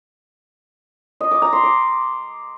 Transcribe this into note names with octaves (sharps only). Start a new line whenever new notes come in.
D#5
D6
A#5
C6
D6